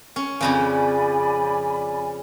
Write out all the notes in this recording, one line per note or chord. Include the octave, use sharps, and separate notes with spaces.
C#4
F2 C#3 F3 D5 G#5 B5